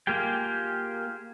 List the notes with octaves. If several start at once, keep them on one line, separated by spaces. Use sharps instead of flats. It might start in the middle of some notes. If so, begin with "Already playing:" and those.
A#3 F4 G4 G#4 G5